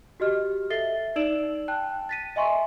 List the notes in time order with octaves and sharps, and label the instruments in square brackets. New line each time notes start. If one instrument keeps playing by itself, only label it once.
[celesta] F#4 G4 D#5 F6
A4 E5 A6 C7 G7
D#4 D5 E6 D7 E7 F#7
G5 A5 F#6
A6 B6 D#7
D#5 E5 G#5 C6 C#6